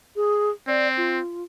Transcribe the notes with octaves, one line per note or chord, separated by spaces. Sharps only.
G#4
C4 D5
F4